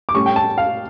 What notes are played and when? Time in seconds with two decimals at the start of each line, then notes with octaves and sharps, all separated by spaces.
0.09 D6
0.15 A2 G3 C#4 C#6
0.26 G5
0.36 A5
0.58 F5